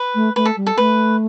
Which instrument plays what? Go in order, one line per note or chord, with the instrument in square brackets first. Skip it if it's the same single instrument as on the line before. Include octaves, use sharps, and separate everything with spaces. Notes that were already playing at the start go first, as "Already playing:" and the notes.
Already playing: [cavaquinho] B4
[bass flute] A3
[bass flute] A3 [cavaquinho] B4
[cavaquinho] A4
[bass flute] G3
[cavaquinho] A4
[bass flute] A3 [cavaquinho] B4